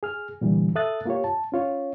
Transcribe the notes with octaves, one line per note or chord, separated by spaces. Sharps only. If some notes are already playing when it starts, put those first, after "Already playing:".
G#4 F6
A#2 D3 E3 G3
A4 E5 D#6 F#6 A6
A#3 F4 G4 C#5
A5
C#4 F4 C#5